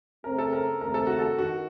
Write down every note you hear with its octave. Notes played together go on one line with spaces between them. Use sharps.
C#3 A3 C4 A#4
A4
A#4
D#2 C#3 A3 C4 A#4
A4
F#4
A4
D#3 F#4